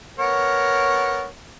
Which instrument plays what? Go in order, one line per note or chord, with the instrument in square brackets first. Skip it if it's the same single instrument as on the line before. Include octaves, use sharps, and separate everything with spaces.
[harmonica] B3 A#4 C#5